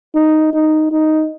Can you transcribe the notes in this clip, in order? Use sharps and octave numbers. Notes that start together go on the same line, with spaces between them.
D#4
D#4
D#4